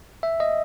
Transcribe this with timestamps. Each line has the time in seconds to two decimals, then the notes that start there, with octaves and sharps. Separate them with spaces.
0.23 E5
0.40 D#5